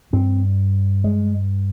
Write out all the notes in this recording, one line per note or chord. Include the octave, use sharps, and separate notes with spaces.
G2 C4
G#3